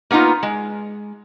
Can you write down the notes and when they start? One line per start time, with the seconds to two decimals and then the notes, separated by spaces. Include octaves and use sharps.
0.11 A#3 B3 C#4 D#4 F4
0.43 G#3